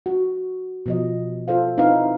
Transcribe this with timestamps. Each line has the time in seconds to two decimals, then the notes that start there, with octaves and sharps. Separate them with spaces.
0.06 F#4
0.86 B2 F3 D#5
1.48 F4 A4 C5 F5
1.78 C4 D#4 E4 B4 F5